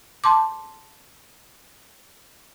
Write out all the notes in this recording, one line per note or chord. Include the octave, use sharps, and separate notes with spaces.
A5 C6 D6